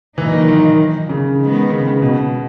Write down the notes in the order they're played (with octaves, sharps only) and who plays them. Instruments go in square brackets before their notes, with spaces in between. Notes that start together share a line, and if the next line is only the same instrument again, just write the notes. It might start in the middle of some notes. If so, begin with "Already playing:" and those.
[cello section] A#2 F#3 A#3 D#4 [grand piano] E3
[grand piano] D#3
D#3
C#3
[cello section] D#3 G#3 B3
[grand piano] C#3
B2